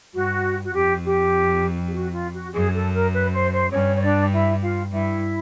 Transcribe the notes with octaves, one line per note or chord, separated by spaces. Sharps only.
G2 F#4
F#4
F2 G4
G4
G4
F#4
F4
F#4
F#2 G#4
A4
A#4
B4
C5
C5
G2 C#4 C#5
C#5
D4 D5
E4 E5
F4 F5
G2 E4 E5